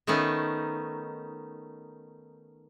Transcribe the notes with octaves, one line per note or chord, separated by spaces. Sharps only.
D#3 A3 B3 C#4 D#4